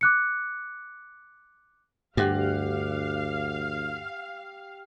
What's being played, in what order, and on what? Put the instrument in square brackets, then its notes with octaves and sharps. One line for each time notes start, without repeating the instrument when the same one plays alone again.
[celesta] D6 F#6 C#7
[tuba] D2 [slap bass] G2 [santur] G4 F#5 [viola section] F5